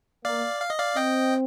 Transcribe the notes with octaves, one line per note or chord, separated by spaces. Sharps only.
A#3 D5 F5
F5
D#5
D5 F5
C4 D#5 G5